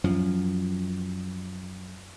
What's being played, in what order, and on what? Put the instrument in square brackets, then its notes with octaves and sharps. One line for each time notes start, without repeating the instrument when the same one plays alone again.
[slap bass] F#2 F3